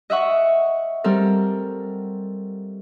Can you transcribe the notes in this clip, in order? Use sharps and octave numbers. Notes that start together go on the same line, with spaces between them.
D#5 E5 F#5 C#6
G3 C4 A4 A#4